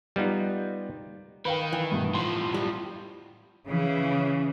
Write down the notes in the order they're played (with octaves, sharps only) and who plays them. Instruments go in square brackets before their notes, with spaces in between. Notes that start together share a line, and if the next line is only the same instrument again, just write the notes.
[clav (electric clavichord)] G3 B3 D#4 F4
[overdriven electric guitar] D#3 [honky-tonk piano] B4 F5 G5
[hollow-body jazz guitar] E3
[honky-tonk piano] G2 B2
[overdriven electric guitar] A2 F3 [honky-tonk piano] C6
[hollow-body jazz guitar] G3 F4
[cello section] C#3 E3